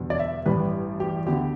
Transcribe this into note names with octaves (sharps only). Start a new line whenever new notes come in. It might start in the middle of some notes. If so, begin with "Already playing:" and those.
Already playing: E1 E2 D3 G3 B3
D5
E5
A1 G2 G3 B4
G4
D2 D3 B3 G4